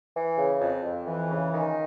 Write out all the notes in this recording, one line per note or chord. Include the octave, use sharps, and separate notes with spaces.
E3
C#3
F2
F2
E3
C#3
D#3